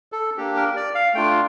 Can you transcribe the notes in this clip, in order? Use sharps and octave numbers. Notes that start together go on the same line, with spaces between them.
A4
A#3 D4 G4
A#4
D5
F5
A3 D4 F4 G5